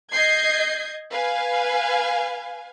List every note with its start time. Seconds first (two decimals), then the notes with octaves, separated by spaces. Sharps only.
0.12 D#5 G6 G#6 C7
1.12 B4 F5 G#5